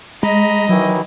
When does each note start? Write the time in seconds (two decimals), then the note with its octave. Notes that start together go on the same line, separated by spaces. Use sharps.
0.23 G#3 D#5 A#5 B5
0.69 D#3 E3 F#3 E4